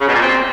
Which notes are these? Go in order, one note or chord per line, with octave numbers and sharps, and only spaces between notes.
C#3
B2
A#2
C4